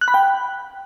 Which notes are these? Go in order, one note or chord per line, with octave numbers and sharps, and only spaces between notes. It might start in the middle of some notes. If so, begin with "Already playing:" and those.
F#6
B5
G5